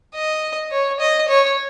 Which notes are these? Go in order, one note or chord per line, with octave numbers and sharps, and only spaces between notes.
D#5
C#5
D#5
C#5